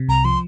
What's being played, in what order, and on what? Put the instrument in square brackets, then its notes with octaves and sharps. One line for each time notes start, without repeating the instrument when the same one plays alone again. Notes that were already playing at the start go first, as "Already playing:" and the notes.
Already playing: [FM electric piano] C3
[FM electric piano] C2 [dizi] A#5
[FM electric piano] F3 [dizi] C6